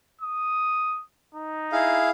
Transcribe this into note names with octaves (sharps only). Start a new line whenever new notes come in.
D#6
D#4
E4 G#4 F5